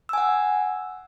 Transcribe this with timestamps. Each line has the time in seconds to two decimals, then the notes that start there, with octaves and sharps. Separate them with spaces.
0.09 E6
0.13 G#5
0.18 F#5